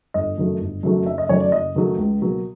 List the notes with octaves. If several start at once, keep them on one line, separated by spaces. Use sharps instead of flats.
G1 D#5
F#2 D#3 F#3 A3
G1
F#2 D#3 F#3 A3
F#1 E5
D#5
F#2 D#3 F#3 A3 C#5
D5
F#1 D#5
F#2 D#3 F#3 A3
C#2
B2 F#3 A#3